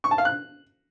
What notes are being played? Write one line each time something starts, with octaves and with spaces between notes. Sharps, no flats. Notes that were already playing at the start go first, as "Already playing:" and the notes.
C#6
A5
F5
F#6